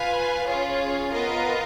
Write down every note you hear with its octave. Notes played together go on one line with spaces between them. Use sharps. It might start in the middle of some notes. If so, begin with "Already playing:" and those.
Already playing: F4 B4 F5 G#5
C#4 F4 G#4 C#5
B3 F4 A#4 D#5